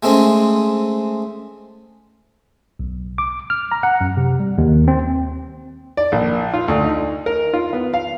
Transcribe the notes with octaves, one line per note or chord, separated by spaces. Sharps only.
G#3 A3 C4 C#4
B1
D6
F6
A#5
F#5
F#2
C3
G3
D#2
C4
D5
A#1
F4
D2
D#4
A#4
F4
B3
F5